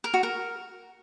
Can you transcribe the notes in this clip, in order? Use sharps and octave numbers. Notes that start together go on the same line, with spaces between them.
A#4
F#4
A#4